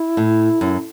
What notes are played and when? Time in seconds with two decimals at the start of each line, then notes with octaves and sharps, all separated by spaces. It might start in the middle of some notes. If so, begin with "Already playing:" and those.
Already playing: E4
0.17 A2
0.61 F#2